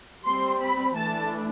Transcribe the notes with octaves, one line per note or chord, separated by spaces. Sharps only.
G3 C4 C6
B5
E3 A3 D4 A5